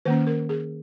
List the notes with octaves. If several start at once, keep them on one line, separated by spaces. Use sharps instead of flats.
D#3 A#3 C#4 B4
A#4
G#4